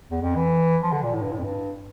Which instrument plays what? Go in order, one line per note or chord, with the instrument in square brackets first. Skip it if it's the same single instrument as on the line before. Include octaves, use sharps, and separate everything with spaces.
[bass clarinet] E2
F2
E3
F3
D3
A#2
A2
G2
A2
F2
G2